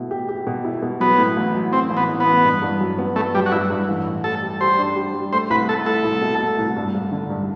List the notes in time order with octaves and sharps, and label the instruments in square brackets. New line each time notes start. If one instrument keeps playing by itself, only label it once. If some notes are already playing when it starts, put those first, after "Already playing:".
Already playing: [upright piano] B2 A3 E4
G4
G4
B2
E4
B2
[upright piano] F#3 [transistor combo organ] B3
[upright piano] A2
A1
F#3
[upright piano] A2 [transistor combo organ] C4
[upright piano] A1
[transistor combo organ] B3
[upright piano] A1
[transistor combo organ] B3
[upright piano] A1
G2
G2
F#3
B3
[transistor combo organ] A3 [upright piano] B3
[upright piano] F#3 [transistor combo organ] G3
[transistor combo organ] F#4
[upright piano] G2 [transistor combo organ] E4
[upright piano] G2
A1
A2
[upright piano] G3 [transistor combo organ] A4
[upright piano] G3
[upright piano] G3 [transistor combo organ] C5
[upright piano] D4
G3
G3
[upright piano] A3 [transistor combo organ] C5
[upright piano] C2 [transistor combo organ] B4
[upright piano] A3 [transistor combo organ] A4
[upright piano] E4 [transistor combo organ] A4
[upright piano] C2
B2
A3
C2
G2
G2
D3
G2